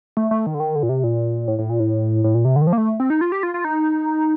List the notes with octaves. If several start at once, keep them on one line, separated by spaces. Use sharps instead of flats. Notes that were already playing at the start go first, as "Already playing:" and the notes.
A3
A3
D#3
D3
D#3
D3
A#2
C3
A#2
A2
A2
A#2
A2
A2
A#2
C3
D3
D#3
F3
A#3
A3
C4
D#4
F4
G4
F4
F4
D#4